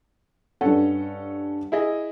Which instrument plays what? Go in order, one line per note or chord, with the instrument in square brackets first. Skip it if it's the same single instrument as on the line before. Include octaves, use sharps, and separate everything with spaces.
[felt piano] G2 F#5 [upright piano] C#4 A4
[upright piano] E4 G#4 D#5